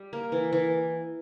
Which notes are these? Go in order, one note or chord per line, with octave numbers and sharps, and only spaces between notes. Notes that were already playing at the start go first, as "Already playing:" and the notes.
Already playing: G3
A#3
E3
E3